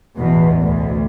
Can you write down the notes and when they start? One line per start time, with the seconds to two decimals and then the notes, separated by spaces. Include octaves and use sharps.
0.18 A1 E2 B2
0.63 D2